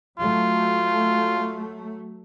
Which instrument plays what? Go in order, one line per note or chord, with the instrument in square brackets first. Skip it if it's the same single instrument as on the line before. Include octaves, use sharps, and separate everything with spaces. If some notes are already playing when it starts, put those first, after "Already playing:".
[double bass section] F#3 A3 [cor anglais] F4